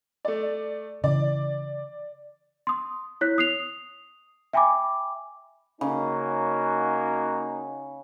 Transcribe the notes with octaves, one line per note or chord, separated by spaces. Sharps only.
A3 D5
C#3 E3 D5
C6 D#6
E4 C#5 F#6 B6
D#6 C7 F7
E5 G5 G#5 B5 D6
C#3 A#3 C#4 D#4 F#4